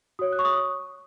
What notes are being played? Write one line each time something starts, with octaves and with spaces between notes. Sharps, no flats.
F#4 C#5 D#6
F#6
C#6
D#6